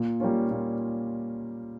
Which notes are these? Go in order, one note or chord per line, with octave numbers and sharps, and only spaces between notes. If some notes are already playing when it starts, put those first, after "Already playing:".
Already playing: A#2
G3 A#3 C#4 F4
A#2